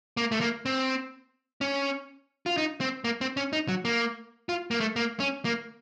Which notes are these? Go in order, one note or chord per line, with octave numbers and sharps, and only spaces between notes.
A#3
A3
A#3
C4
C#4
F4
D#4
C4
A#3
C4
C#4
D#4
F#3
A#3
F4
A#3
A3
A#3
C#4
A#3